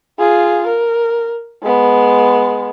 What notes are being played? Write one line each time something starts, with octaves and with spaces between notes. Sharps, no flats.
F4 G#4
A#4
G#3 B3